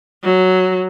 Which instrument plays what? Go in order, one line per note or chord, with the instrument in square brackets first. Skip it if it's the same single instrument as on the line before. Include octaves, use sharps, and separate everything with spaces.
[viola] F#3